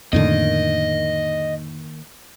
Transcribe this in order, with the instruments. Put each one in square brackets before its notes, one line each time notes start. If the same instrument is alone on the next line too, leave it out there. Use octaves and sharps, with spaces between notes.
[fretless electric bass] F2 A2 D3 [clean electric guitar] D#3 A#3 [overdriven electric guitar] D#5